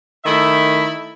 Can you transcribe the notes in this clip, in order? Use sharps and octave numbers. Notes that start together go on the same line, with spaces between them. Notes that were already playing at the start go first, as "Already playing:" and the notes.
D#3 A3 E4 D#5 E5